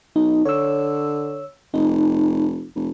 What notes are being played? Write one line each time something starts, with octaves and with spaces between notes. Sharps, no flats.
B1 D#4
D3 C#5 E6
F1 D#4
F1